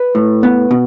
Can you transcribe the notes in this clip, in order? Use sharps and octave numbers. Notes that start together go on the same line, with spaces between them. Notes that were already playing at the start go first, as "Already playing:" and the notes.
Already playing: B4
A2
B3
B2